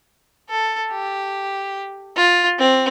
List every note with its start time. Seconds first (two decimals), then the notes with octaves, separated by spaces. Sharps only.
0.49 A4
0.91 G4
2.16 F4
2.59 C4